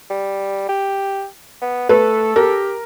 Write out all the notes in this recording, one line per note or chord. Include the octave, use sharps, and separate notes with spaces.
G3
G4
B3
A3 A4 B4
G4 A#4